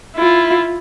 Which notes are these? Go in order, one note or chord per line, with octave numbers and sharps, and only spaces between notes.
E4 F4